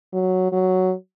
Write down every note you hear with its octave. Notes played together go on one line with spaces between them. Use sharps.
F#3
F#3